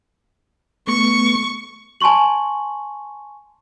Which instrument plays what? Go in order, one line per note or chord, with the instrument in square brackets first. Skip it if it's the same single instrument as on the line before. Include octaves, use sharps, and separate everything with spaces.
[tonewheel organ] A3 B3 [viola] C#6
[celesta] G#5 A5 C6 C#6 F#7